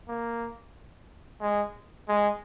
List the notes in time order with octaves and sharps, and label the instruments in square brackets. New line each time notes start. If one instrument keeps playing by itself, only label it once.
[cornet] A#3
G#3
G#3